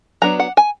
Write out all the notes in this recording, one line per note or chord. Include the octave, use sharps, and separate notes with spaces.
F#3 B3 D4 A#5
F#5
G#5